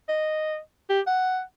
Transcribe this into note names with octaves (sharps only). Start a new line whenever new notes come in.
D#5
G4
F#5